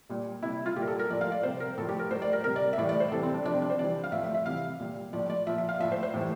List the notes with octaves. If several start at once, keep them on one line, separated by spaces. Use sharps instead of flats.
A#2 G3
C3 G3 E4
F4
A#2 G3 G4
A#4
A4
A#4
A2 F3 D5
F5
D5
C3 G3 C5
A#4
A2 F3 A4
G4
A#4
A2 G3 C5
D5
A#4
C3 G3 A#4
D5
E5
A2 E3 G3 D5
D5
C5
C3 E3 G3 A4
C4
D4
C3 F3 D4
C4
D4
C5
C3 E3 G3 D5
F5
A2 F3 E5
E5
E5
C3 E3 G3 F5
A#2 G3
A2 F3 D5
D5
A#2 F3 E5
E5
F5
A2 F3 E5
C5
C5
A2 E3 G3